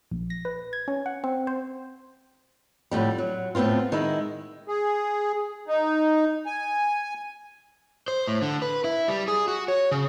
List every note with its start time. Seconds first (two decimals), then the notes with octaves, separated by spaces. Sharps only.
0.11 A#1
0.30 A#6
0.45 B4
0.73 G#6
0.88 C#4
1.06 F#5
1.24 C4
1.47 C5
2.91 F2 A2 D3 G3
3.18 F#3
3.55 A2 A3 B3 C4 F4
3.92 D#3 G#3 E4
4.68 G#4
5.68 D#4
6.46 G#5
8.08 C5
8.27 A2
8.42 D3
8.62 B4
8.84 E4
9.08 G3
9.28 G#4
9.48 F#4
9.68 C#5
9.91 C#3